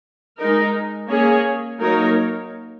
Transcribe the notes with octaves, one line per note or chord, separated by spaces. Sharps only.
G#3 D#4 A#4
A#3 C#4 G#4 C#5
F#3 A#3 D#4 A#4 C#5